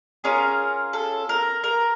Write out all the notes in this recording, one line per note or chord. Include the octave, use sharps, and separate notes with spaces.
C#4 F4 G#4 A#4
A4
A#4
A#4